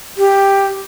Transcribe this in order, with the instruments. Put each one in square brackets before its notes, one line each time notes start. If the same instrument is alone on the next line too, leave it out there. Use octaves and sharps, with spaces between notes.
[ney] G4